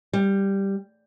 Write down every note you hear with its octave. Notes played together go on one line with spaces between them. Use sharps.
G3